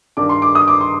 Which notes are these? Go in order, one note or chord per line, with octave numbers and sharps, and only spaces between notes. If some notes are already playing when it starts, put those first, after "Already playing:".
G2 D#3 G3 D4 D6
C6
D6
D#6
D6
C6